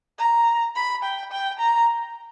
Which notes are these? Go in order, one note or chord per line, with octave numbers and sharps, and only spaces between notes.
A#5
B5
G5
G5
A#5